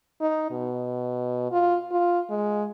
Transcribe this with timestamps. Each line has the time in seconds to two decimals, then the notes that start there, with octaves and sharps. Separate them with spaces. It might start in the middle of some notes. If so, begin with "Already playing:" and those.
0.21 D#4
0.51 B2
1.52 F4
1.91 F4
2.30 G#3